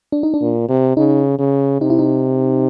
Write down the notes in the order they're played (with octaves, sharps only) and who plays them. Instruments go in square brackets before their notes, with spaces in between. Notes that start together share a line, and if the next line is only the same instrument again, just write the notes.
[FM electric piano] D4
D#4
D4
[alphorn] A#2
C3
[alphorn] C#3 [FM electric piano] D#4
[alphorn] C#3
[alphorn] C3 [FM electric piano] D#4
[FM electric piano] E4
D#4